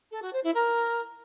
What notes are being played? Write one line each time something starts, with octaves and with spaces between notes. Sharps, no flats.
A4
F#4
C5
E4
A#4